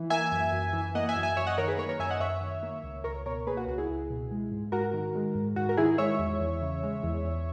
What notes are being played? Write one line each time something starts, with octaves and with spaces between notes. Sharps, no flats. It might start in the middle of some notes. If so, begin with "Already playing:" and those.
Already playing: E3
A#3 E5 G#5
F#2
F#2
E3
A#3 D#5 F#5
E5 G#5
F#2
E5 G#5
F#2 C#5 E5
D#5 F#5
D#3 A#4 C#5
G#4 B4
A#3 A#4 C#5
A#4 C#5
F#2 E5 G#5
D#5 F#5
F#2 C#5 E5
D#3
A#3
C#2
C#2 A#4 C#5
B2 A#4 C#5
A#3 G#4 B4
F#4
C#2 F#4
E4 G#4
C#2
B2
G#3
G#2
G#2 F#4 A#4
D#3
G#3
G#2
G#2 F#4
A#4
D#3 E4 G#4
G#3 C#5 E5
E2
E2
C#3
G#3
E2
E2